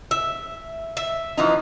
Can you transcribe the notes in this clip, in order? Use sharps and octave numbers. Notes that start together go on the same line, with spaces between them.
E5
E5
E3 F3 D#4